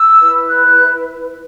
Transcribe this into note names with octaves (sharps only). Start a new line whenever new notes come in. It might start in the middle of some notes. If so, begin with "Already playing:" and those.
Already playing: E6
E4 B4
F#6